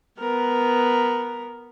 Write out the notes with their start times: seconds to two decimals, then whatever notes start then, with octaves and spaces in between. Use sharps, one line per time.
0.20 B3 A#4